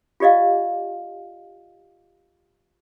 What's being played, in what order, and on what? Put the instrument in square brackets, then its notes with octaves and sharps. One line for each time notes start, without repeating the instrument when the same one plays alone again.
[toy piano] F4 G4 D5 D#5 F5